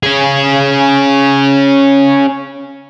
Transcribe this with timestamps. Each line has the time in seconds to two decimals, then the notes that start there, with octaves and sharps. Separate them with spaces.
0.03 C#4 G#4